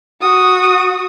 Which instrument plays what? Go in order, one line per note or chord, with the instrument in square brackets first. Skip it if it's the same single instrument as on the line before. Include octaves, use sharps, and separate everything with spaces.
[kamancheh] F#4 D#6